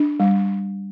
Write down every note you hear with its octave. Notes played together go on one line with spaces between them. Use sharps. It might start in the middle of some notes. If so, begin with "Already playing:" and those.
Already playing: D4
G3